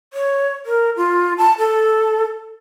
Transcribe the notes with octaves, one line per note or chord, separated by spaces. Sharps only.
C#5
A#4
F4
A5
A4